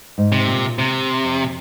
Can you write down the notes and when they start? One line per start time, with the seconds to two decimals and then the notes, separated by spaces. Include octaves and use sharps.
0.18 G#2
0.32 C3
0.47 A#2
0.79 C3
1.24 F2